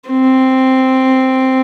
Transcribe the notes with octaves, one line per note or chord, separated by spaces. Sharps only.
C4